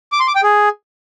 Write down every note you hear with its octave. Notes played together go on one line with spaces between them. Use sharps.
D6
C6
D6
G5
G#4